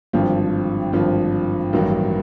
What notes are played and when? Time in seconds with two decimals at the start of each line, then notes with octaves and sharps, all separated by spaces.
0.13 G#1 G2 D3 F3
0.93 G#1 G2 D3 F3
1.73 A1 G2 D#3 F#3 A#3